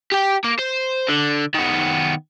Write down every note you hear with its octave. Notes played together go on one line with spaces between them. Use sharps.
G4 G5
A#3
C5
D3
D#3 B3